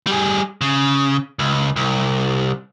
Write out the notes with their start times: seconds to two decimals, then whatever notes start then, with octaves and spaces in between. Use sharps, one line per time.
0.07 G3 G#4
0.61 C#3
1.39 C#2
1.76 C2